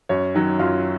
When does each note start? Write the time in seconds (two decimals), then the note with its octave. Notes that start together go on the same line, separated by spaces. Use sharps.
0.09 F#2 C#5
0.34 D#3 F#3
0.59 F#2 F4